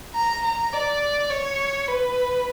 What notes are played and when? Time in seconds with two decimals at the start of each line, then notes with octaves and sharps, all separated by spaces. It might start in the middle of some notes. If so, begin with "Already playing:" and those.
0.15 A#5
0.44 A#5
0.73 D5
1.30 C#5
1.88 B4